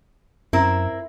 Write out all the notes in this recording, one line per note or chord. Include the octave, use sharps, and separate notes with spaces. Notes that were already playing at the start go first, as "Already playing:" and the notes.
F#2 C4 E4 A#4